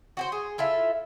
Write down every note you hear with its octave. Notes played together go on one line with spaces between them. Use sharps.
F#4 G4 C5
G#4
E4 F4 A4 E5